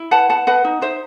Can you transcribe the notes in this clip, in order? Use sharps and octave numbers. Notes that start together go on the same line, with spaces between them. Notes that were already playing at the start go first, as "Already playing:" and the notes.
Already playing: E4
B4 F#5 A5
B4 F#5 A5
B4 D#5 F#5
D#4
D#4 C5 E5